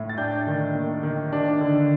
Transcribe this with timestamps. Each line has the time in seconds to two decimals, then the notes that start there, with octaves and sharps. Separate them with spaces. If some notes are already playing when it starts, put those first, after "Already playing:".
Already playing: A2
0.09 A6
0.18 D4 G5 G6
0.47 D#3
0.75 A#3
1.03 D#3
1.33 D4
1.60 D3